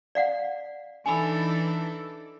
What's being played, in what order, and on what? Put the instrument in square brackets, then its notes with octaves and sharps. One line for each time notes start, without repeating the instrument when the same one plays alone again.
[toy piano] D5 F5 F#5
[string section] E3 [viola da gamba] D4 D#4 A4 [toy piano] G#5 B5